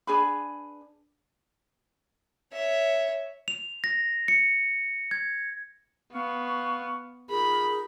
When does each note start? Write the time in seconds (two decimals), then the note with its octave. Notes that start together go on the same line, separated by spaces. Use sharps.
0.07 D4 G#4 B4 B5
2.53 C#5 E5
3.48 F7
3.84 A#6
4.28 C#7
5.11 G#6
6.13 B3 F5 C#6
7.30 D#4 F4 G#4 A#4 B5